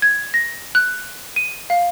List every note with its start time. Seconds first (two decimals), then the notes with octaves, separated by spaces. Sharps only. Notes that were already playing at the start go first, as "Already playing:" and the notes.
0.02 G#6
0.34 A#6
0.75 F#6
1.36 D#7
1.70 F5